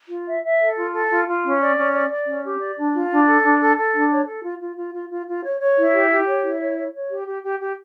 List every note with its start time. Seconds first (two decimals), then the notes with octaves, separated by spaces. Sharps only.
0.10 F4
0.27 E5
0.43 E5
0.60 A4
0.76 F4
0.93 A4
1.10 F4
1.26 F4
1.43 C#4
1.60 D5
1.77 C#4
1.93 D5
2.10 D5
2.27 C#4
2.43 G4
2.60 D5
2.77 D4
2.94 F4
3.10 D4
3.27 A4
3.43 D4
3.60 A4
3.77 A4
3.93 D4
4.10 C#5
4.27 A4
4.43 F4
4.60 F4
4.77 F4
4.93 F4
5.10 F4
5.27 F4
5.44 C#5
5.60 C#5
5.77 E4
5.93 G4
6.10 G4
6.27 C#5
6.43 E4
6.60 C#5
6.77 C#5
6.93 C#5
7.10 G4
7.27 G4
7.44 G4
7.60 G4